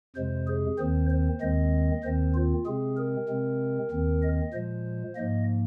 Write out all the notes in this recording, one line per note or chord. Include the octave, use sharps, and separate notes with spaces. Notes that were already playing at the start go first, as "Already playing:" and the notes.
F2 C3 G#3 C5
G#4
D#2 D#3 C4 C5
C5
D#2 D#3 G#3 C4 D#5
D#2 D#3 C4 C5
F4
C3 G#3 C4 G#4
A#4
C3 G#3 C4
D#2 D#3 C4
D#5
A#2 F3 G#3 C5
G#2 F3 A#3 D#5